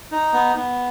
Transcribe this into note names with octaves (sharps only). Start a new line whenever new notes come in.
D#4
B3
B3